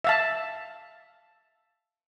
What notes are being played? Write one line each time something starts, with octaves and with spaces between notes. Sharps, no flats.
E5 F5 A5